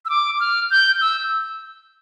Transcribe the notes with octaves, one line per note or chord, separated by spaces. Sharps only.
E6
D6
F6
G6
E6